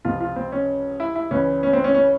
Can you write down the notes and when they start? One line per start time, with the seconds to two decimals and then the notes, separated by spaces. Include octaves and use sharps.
0.05 C#2 C3 F3 F4
0.20 F4
0.36 C4
0.52 C#4
1.00 E4
1.15 E4
1.31 C#2 C#3 E3 C#4
1.63 C#4
1.73 C4
1.84 C#4
1.94 C#4